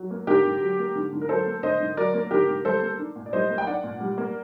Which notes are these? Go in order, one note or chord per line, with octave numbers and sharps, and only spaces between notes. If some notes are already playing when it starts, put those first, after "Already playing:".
Already playing: F#3
A#3
D3 G4 A#4
D3
F#3
A#3
D3
D3
A#4
F#3 A4 C5
A#3
D3 C5 D#5
D3
F#3 A#4 D5
A#3
D3 G4 A#4
D3
G3 A4 C5
A#3
D4
A#2
D5
G3 C5 D#5
A#3
G5
D4 D5 F#5
A#2
G3
A#3